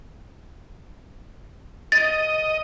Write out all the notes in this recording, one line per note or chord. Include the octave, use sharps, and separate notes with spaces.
D#5 A6